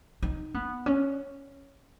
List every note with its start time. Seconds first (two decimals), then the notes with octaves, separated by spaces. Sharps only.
0.22 D#4
0.54 B3
0.86 C#4